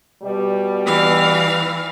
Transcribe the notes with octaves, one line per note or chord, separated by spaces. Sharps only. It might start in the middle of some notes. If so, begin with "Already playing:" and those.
B2 G3
E3 F5